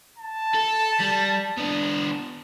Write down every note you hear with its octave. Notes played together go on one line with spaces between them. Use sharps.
A5
A4
G3
B3 D4